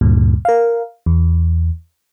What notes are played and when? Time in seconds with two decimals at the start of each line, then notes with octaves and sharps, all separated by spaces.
0.01 D2 G2 A#2
0.45 A#4 F5
1.06 E2